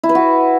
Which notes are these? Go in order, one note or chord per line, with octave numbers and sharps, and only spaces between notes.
E4
B4
F#4